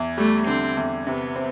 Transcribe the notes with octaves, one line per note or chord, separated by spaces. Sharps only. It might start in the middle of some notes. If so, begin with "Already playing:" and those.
Already playing: E2
G3 A3
D3 C4
E2
C3 B3
C4